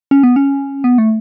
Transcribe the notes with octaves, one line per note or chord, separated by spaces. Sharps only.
C#4
B3
C#4
B3
A3